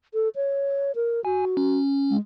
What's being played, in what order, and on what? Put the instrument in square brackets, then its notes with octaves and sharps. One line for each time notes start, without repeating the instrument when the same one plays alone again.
[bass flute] A4
C#5
A#4
[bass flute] F#4 [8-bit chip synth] G#5
[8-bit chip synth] C#4
[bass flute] G#3